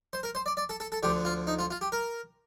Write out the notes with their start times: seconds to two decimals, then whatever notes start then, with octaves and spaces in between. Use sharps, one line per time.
0.13 C5
0.23 A#4
0.35 C5
0.46 D5
0.57 D5
0.69 A4
0.80 A4
0.92 A4
1.03 D2 D3 F3 G4
1.25 F4
1.47 D#4
1.59 F4
1.70 F4
1.81 G4
1.92 A#4